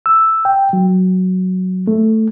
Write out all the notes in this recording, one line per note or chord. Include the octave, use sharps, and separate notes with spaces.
E6
G5
F#3
A3